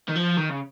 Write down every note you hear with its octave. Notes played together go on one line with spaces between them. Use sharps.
D#3
F3
D#3
C#3